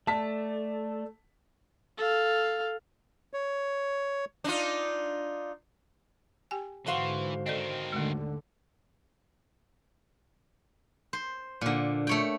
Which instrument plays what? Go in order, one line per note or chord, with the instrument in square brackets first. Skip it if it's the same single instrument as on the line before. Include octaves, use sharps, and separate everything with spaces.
[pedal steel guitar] A3 [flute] D5 [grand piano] A5 B6
[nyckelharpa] A4 F5
[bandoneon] C#5
[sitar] D4 D#4 F4
[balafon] G4 G5 G#5
[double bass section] G#2 D3 [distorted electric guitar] E3 [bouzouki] F#4 C5 F5
[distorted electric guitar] D#3 C4 [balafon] A4 D5 D#5
[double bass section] D#2 D3 [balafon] G#3 A3
[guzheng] C5
A#2 D3
A3 C#5 G5